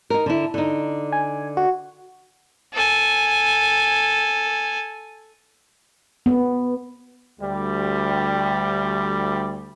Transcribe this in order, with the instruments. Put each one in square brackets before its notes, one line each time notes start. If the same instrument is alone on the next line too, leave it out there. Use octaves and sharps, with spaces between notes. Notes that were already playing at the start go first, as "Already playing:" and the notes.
[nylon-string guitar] D#4 A#4
D3 E4
D3 D#4
[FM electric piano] G#5
F#4
[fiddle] A4 G#5
[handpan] B3
[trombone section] D2 G3